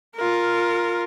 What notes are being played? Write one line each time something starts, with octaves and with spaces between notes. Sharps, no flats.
F4 A#4